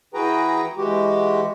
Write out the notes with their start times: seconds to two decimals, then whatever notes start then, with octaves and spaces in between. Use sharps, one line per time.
0.14 E3 F#4 G#4 B4 G5 A#5
0.77 E3 G#3 F#4 G4